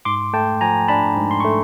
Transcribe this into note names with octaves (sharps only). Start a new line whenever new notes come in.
G#2 C6 D6
A3 G5 A5
F3 G#5 A#5
D4 A5 B5
G#2
C6
A3 C#6